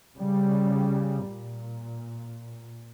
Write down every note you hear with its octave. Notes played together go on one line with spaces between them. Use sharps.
C#3 G3
A#2